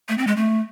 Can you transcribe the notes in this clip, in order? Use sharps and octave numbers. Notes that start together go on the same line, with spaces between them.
A3
C4
G#3
A3